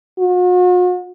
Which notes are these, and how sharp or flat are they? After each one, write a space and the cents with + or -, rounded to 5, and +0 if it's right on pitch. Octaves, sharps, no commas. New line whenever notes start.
F#4 -45